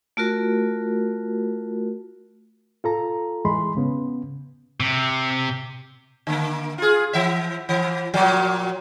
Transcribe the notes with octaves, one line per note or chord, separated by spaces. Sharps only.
A3 F4 F#4 A#4
F4 A4 A#5
E3 G#3 B5 C6
C#3 B3
C3
D3 A#3
F4 G#4
E3 E5
E3
A#2 F3 F#3